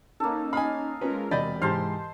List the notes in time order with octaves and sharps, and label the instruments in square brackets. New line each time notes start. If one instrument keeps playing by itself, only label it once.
[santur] A#3 A4 [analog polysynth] C#4 D#4
[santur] D#5 F5 [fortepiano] G#5 B5
[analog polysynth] G#3 F4 A#4 [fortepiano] C#4 B4
[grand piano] E1 G6 A6 [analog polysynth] C3 [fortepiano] D5 D#5 [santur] B5
[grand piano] G#2 E3 [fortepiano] G4 F6 [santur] C5 A5 C6